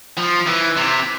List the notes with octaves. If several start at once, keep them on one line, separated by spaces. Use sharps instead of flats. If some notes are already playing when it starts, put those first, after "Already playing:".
F3
E3
C3